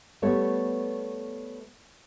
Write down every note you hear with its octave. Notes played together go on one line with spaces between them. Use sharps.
G3 A3 B3 A4 C#5